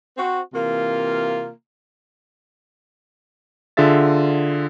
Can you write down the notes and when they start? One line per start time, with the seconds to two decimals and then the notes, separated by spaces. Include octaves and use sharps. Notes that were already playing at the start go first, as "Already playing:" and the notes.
0.18 C4 F#4
0.53 C3 E3 A#3 F4
3.77 D3 F4 G#4 E5 A6